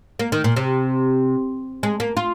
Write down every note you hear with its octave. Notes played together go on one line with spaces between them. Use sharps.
A#3
D#3
A#2
C3
G#3
A#3
F4